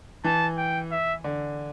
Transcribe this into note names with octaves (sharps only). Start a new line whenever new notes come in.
E3 A5
G5
E5
D3